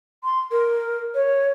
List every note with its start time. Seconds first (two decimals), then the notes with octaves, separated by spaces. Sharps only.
0.24 C6
0.51 A#4
1.14 C#5